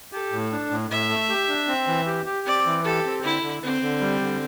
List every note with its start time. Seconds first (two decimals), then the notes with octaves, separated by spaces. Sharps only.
0.12 G4 A4
0.32 A2
0.52 D4
0.70 A2
0.91 A2 E5
1.09 A3
1.30 G4
1.49 D4
1.68 C4
1.87 E3
2.07 G4
2.26 G4
2.46 C4 D5
2.66 E3
2.85 G4 A4
3.05 C4
3.24 D3 E4
3.43 D3
3.63 D3 C4
3.82 D3
4.01 G3
4.21 D3